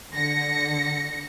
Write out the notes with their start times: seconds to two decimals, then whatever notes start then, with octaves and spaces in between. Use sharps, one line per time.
0.13 D3 A#6 C#7